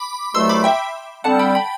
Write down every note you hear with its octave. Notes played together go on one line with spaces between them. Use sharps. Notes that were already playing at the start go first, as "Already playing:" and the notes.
Already playing: B5 D6
C2 B2 F#3 A3 C6 E6
B5 D6
E5 G5
D3 G3 C4 F#5 A5
G5 B5
G5 B5